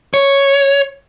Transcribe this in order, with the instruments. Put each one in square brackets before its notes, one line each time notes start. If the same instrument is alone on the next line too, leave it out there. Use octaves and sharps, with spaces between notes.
[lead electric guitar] C#5